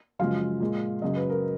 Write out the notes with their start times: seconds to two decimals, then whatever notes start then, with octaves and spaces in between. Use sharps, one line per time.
0.19 F#2 C#3 F3 G#3 F5
0.60 A#2 G#3
1.02 F#2 C#3 F#3 D#5
1.16 B4
1.29 A#4